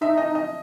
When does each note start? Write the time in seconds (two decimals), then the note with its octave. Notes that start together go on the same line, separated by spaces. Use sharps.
0.01 D#4 E5
0.17 D#5
0.35 D#5